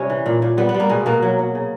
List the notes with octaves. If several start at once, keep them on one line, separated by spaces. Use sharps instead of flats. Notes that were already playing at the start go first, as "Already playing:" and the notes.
Already playing: C3 G3 C#4
E3
A#2
A#2
G3 B3
B3
G3
A#3
B2 G#3
B2 A#3
F#3
F#3
C#3